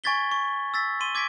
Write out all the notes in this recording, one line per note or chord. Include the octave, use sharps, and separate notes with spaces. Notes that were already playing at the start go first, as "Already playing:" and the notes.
G#5 C#6 G#6 A6 B6 G7
C#6
E6 A6 B6
C6 D#7 G7
D6 G#6 A#6 B6 D7